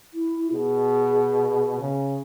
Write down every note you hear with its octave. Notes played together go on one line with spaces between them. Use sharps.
E4
B2 G#4
C#3